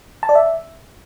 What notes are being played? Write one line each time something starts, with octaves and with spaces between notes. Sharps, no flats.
A5
D5
E5